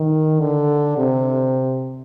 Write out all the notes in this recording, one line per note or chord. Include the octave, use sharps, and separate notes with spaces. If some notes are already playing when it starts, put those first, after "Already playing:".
Already playing: D#3
D3
C3